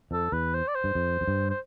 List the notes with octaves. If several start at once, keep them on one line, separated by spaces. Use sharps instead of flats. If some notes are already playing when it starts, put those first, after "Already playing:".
F2 A4
E2 B4
C5
D5
C5
G2
F2
F2
G2
C5